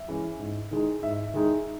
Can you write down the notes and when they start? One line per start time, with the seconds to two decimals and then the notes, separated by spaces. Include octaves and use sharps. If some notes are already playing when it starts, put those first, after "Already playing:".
Already playing: E5
0.08 E3 G#3 C#4
0.40 G#2
0.71 D#3 G#3 D#4
1.03 G#2 E5
1.34 D#3 G#3 D#4